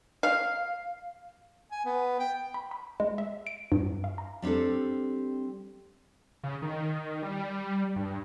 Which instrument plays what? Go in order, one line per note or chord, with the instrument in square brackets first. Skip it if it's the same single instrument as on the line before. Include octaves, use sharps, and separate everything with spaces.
[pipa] F5
[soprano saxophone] G#5
B3
G5
[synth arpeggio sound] B5
B5
G#3
E5
D7
G2
F5
A#5
[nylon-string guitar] G3 C4 D4 G4 A4
[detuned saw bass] C#3
D#3
G3
G2